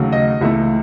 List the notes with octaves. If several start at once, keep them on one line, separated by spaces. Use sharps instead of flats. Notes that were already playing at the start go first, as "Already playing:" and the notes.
Already playing: D#2 C#3 F#3 A3
D#5
C#2 C#3 E3 A3 E5